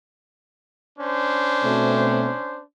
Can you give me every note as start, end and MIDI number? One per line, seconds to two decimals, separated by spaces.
0.99 2.61 61
0.99 2.61 62
0.99 2.61 72
1.64 2.31 47
1.64 2.31 57
1.64 2.31 60